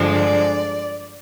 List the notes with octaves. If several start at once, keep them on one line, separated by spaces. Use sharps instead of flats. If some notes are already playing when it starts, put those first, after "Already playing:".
Already playing: G2 D3 F3 G#3 D4
D5